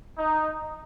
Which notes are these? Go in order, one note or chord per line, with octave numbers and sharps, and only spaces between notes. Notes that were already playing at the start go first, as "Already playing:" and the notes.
D#4